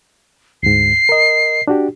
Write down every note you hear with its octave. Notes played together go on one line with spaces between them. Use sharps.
D2 G#2 C7
A#4 D#5
D4 F#4 G4